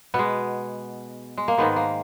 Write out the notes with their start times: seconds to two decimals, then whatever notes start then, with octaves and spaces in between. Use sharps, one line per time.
0.14 B2 G#3 B3
1.38 G#3
1.48 A#3
1.58 G#2 D#3 G#3 B3
1.76 A#3